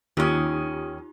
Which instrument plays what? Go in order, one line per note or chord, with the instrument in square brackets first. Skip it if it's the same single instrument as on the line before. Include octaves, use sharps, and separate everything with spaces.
[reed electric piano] D#2 D#6 [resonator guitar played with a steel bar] D#3 C#4 [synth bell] D#4 F4 G4